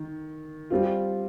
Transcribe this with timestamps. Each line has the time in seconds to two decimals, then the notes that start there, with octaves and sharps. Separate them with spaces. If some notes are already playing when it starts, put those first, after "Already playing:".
Already playing: D#3
0.70 G3 C4 F4